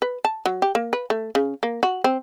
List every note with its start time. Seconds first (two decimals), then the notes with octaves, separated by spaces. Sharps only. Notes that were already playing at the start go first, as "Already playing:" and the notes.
0.02 B4
0.25 A5
0.46 F#3
0.62 G4
0.75 A#3
0.93 B4
1.10 A3
1.35 C#3
1.63 A#3
1.83 F#4
2.04 C4